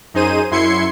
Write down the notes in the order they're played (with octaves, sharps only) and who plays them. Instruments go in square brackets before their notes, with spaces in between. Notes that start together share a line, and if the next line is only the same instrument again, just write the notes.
[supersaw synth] F#2 D#4 G#4 C5 D#7
F#2 E4 C6 G#6 C7 C#7